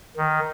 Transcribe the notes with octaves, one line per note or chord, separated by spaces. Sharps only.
D#3